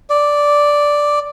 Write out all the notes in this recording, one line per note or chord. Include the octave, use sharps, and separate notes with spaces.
D5